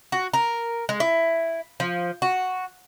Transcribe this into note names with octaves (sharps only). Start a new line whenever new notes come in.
F#4
A#4
G#3
E4
F3
F#4